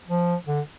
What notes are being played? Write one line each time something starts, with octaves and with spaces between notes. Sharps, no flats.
F3
D3